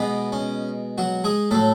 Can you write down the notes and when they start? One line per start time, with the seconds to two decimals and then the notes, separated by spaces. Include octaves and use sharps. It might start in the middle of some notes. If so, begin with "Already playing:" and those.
Already playing: B2 G#3 B3
0.32 C#4
0.98 F#3 F#4
1.24 G#3 G#4
1.51 A2 F#3 A3 A4